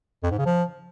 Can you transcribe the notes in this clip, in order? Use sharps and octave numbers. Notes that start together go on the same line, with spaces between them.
F2
G#2
C#3
F3